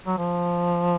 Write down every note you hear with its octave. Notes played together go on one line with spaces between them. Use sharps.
F#3
F3